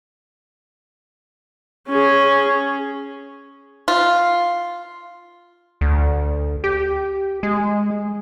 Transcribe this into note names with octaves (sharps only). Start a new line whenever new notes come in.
C#4 G#4
F4
D2
G4
G#3